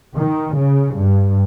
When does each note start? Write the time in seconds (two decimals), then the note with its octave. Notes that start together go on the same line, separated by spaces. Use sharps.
0.18 D#3
0.57 C#3
0.97 G2